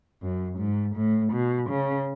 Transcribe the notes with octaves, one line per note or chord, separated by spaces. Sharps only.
F#2
G#2
A2
B2
C#3